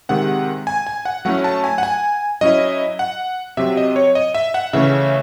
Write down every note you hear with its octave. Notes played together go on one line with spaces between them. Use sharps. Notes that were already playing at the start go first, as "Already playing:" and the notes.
C3 D#3 G#3 C4 F#5
G#5
G#5
F#5
F#3 A3 C#4 E4 F#5
A5
G#5
F#5
G#5
F#3 C#4 E4 D#5
F#5
C3 F#3 C4 E5
D#5
C#5
D#5
E5
F#5
C#3 E3 A3 C#4 E5